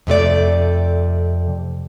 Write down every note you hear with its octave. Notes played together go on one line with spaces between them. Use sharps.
F2 C3 A3 D5